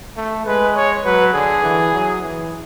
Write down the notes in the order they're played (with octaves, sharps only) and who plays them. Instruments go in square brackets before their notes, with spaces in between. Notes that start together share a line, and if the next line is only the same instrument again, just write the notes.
[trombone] A3
[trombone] G#3 [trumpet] B4
[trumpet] C#5
[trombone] F#3 [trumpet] B4
[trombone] D3 [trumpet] G#4
[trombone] E3
F#3
E3